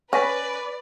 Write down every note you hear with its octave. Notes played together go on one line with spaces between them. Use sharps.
C#4 B4 D5 G#5 A#6 B6